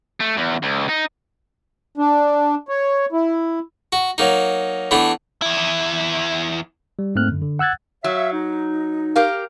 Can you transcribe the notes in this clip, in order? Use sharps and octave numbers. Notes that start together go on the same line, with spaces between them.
A3
E2
C#2
D#4
D4
C#5
E4
F#4
F#3 A#3 D#4
E3 A3 B3 D4
E2 E4
G3
G#2 A3 A#3 C4 F6 F#6
F#2 D3
D3
F#5 E6 F#6 G#6 A6
F#3 C#5 E5 F5
D#4
G4 A#4 F5